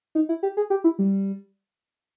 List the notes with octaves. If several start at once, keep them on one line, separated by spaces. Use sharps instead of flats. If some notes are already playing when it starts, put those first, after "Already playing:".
D#4
E4
G4
G#4
G4
E4
G3